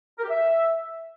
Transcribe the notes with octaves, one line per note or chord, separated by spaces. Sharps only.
A#4
G4
E5